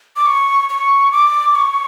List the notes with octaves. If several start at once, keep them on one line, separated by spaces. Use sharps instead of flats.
D6
C#6
C#6
D6
C#6